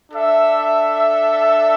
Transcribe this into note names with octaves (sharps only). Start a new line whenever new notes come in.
D4 A4 E5